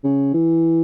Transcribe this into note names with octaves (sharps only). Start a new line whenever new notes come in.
C#3
E3